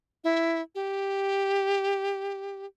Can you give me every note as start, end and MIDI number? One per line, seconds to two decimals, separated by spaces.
0.24 0.61 64
0.75 2.66 67